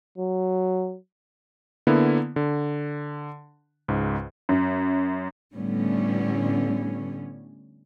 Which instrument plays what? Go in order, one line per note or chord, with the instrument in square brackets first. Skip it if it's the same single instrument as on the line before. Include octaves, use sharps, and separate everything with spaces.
[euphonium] F#3
[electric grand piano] D3 A#3 B3 E4
D3
C#2 G#2
[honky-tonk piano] F#2
[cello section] A2 D3 G3 B3 C#4